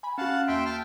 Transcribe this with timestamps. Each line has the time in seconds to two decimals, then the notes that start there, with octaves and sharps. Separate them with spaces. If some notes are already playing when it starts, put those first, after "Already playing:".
0.03 G#5 B5
0.18 C#4 F#4 F5 F#5 A5
0.48 E2 A#3 E5 G5 C6 D7
0.65 G5 A5 F6